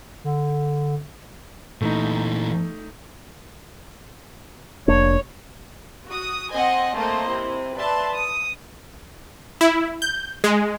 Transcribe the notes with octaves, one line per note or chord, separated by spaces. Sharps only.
D3
A#2 E3 A3 D#4
F1 A#3 D4 C#5
F#4 D#6
C4 C5 D#5 F#5 G#5
A3 A#3 C4 C5 D#5
C3 E4
B4 D5 E5 A5 C6
D#6
E4
G6
G#3